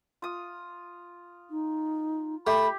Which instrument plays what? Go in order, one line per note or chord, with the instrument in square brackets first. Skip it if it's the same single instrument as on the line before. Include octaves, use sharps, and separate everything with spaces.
[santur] F4 D#6
[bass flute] D#4
[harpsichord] A3 [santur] G4 [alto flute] B5